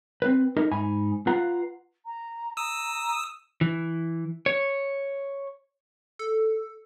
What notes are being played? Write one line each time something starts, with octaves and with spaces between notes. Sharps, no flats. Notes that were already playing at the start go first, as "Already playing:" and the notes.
C4 B4
D#4 E4 A4 A#4 D#5
G#2 D#4 G#5 B5
F4 B4 F5 F#5 A#5
A#5
A#5 D#6 E6
E3
C#5
A4